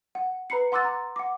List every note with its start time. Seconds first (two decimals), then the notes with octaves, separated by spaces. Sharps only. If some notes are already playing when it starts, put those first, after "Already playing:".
0.15 F#5
0.50 B4 A#5 B5 C7 C#7
0.72 F#5 C6 D6 E6 F#6 A6
0.85 A#5
1.16 F#5 D6